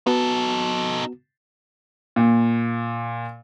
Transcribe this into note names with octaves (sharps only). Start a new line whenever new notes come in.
B3 D#4 F#4 A4
A#2